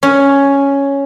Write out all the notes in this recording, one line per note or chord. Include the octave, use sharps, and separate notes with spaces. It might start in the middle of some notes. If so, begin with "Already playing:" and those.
C#4